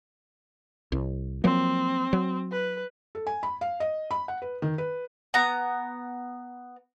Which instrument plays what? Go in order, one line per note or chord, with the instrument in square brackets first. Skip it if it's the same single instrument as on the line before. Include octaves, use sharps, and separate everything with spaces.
[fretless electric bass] C2
[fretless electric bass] F3 F#3 A#3 [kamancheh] C4
[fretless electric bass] F#3
[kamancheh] B4
[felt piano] A4
G#5
B5
F5
D#5
B5
F#5
B4
D#3
B4
[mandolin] B3 A#5